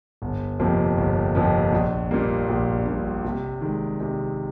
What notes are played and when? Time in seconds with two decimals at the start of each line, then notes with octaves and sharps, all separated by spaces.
0.22 G1
0.59 F2 C3 F3 A#3
0.98 G1
1.35 F2 C3 F3 A#3
1.72 A#1
2.11 A#2 G3 A#3
2.48 A#1
2.86 A#2 G3 A#3
3.24 C3
3.61 D#3 G#3
4.00 C3